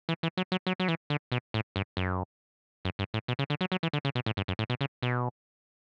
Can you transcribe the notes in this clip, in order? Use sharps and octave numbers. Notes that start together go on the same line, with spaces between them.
E3
E3
F#3
F#3
F#3
F#3
E3
D3
B2
A2
G2
F#2
F#2
G2
A2
B2
C#3
D3
F#3
F#3
E3
D3
C#3
B2
A2
G2
F#2
A2
B2
C#3
B2